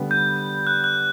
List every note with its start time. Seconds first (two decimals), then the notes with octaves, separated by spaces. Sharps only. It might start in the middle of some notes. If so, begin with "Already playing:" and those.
Already playing: D3 G3 B3
0.11 G6
0.67 F#6
0.84 F#6